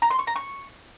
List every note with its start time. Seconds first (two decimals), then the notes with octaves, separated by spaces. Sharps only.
0.02 A#5
0.10 C6
0.19 C#6
0.27 A#5
0.36 C#6